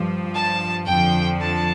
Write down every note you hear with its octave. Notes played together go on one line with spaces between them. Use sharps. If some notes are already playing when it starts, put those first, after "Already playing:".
Already playing: G2 F3
A5
F2 D3 F3 G5
A5